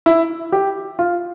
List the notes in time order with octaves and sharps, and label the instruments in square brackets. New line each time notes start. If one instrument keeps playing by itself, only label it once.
[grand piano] E4
G4
F4